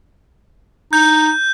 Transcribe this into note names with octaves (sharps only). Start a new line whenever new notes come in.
D#4 G6